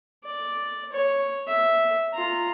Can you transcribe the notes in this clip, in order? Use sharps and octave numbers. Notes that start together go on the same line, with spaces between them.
D5
C#5
E5
F4 A#5